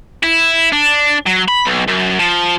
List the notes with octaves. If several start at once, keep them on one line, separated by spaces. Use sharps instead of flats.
E4
D4
F#3
B5
B1
F#2
F3